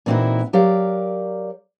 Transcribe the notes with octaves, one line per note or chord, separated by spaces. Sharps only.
A#2 E3 C4 D#4 E4 F#4
F#3 G4 A#4 D5 F5